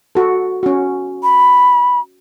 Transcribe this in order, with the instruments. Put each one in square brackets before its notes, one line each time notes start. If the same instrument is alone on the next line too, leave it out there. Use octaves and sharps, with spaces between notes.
[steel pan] F#4 A4
C#4 F#4
[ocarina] B5